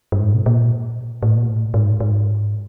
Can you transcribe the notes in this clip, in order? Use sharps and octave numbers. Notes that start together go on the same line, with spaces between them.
G2
G#2
B2
A#2
A2
A#2
A2
G#2
G#2